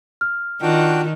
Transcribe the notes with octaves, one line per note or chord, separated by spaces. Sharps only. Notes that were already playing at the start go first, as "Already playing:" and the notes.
F6
D#3 D4 F4 F#4 G5